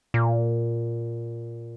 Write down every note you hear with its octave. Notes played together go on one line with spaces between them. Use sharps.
A#2